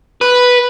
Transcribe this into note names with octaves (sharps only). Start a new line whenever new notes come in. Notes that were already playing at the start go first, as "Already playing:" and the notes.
B4